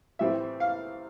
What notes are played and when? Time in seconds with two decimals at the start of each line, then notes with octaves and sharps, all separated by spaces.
0.19 A2 E3 G3 C4 E5
0.60 F5